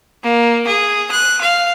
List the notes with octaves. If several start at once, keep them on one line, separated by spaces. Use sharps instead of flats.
A#3
G#4
F#6
F5